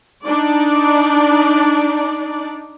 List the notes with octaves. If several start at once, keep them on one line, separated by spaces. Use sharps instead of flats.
D4 D#4 D5